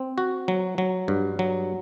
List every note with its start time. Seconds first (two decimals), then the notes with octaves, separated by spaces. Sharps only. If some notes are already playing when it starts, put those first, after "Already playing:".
Already playing: C4
0.18 F#4
0.48 F#3
0.78 F#3
1.08 G2
1.39 F#3